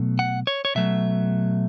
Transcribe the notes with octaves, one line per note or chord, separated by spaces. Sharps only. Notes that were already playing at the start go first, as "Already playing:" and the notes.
Already playing: B2 F#3 A3
F#5
C#5
C#5
B2 F#3 A3 E5